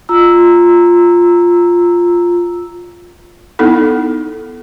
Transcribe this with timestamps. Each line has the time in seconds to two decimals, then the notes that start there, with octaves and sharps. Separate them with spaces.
0.09 F4 A#5 E6
3.59 B3 D#4 E4 A4